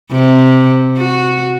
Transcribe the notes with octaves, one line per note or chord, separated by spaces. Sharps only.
C3
F#4